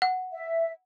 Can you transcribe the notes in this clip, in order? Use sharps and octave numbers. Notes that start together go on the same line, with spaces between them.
F#5
E5